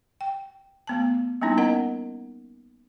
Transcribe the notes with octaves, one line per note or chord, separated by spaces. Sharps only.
G5
A3 B3 A5
G3 A#3 B3 C#4 D#4 E4
B3 A#4 D#5 F#5 A#5